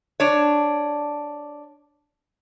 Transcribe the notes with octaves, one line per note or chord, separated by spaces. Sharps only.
D4 C#5